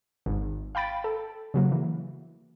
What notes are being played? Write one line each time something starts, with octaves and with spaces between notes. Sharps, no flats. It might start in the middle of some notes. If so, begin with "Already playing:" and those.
G#1
F5 G5 B5 A6 D7
A4
C#3 F#3 A#3
E3